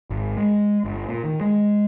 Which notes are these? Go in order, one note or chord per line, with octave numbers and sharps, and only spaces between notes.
G#1
G#3
G1
A#2
D#3
G#3